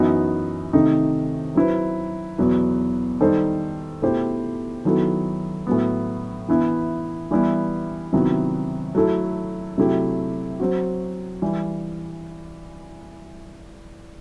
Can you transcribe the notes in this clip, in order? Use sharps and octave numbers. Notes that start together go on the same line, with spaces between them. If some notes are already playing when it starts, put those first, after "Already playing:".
Already playing: F#2 E3 B3 D#4 F#4
C3 D#3 A3 D#4
F#3 C4 E4 B4
E2 B2 F#3 B3
D#3 G3 D#4 A4 C5
B2 A3 E4 G4 C5
D#3 F#3 B3 E4 A4
A2 F#3 B3
E3 B3 E4
E3 G3 B3 E4
C3 D#3 F#3 B3 E4
F#3 A3 E4 A4
C3 F#3 A3 E4 G4
F#3 C4 F#4
E3 G3